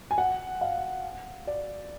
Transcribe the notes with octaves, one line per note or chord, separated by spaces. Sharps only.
G#5
F#5
F5
D5